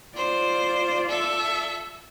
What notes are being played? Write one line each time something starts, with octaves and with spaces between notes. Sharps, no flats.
F4 C5 D5
A4 E5